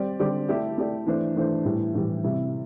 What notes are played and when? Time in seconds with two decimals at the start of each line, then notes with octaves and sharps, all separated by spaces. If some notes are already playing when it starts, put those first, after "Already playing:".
Already playing: G3 C4 G4 D5
0.19 D3 G3 C4 G4 D5
0.48 A3 E4 G4 D5
0.77 A3 E4 G4 D5
1.07 E3 A3 D4 C5
1.36 E3 A3 D4 C5
1.65 A2 E3 G3
1.94 A2 E3 G3
2.24 C3 G3 E4